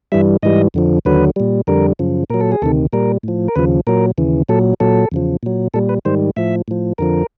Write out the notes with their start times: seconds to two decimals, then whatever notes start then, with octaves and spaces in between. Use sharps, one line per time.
0.12 G2 E3 G3 E5
0.43 G#2 E3 G3 D#5
0.74 F2 D3 F3
1.05 D#2 D3 F#3 B4
1.36 A#2 G3
1.67 F2 D3 G3 A#4
1.99 F#2 C#3 F3
2.30 A#2 F#3 A#4
2.40 A4
2.52 G#4
2.62 D2 C3 D#3 A4
2.93 A#2 G3 A#4
3.23 A2 F3
3.48 A#4
3.56 D#2 C#3 F3 B4
3.87 A#2 F#3 A#4
4.18 D#2 C#3 E3
4.49 A#2 F#3 A4
4.80 A#2 F#3 A4
5.12 E2 C#3 F3
5.43 A#2 F#3
5.74 A#2 G3 A4
5.89 B4
6.05 G#2 D#3 G3 C5
6.36 A2 F3 E5
6.68 A2 F3
6.98 F2 D3 F3 A#4